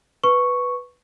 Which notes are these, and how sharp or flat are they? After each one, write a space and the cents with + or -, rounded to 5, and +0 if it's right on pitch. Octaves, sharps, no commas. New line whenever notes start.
B4 +0 C#6 +0